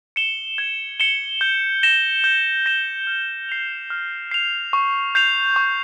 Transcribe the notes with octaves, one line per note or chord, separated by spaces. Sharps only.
C#7 E7 G7
G#6
C#7 E7 G7
G6
A#6 E7 G7
G6
A#6 E7 G7
F6
C7 F7
F6
C7 F7
C#6
G6 C7 F7
C#6